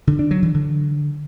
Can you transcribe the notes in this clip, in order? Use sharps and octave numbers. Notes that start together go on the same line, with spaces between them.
D3
D4
F#3
E3
D3